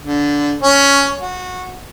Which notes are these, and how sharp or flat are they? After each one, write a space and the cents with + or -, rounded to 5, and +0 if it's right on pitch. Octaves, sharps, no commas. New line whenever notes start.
D3 -15
C#4 +10
F#4 -20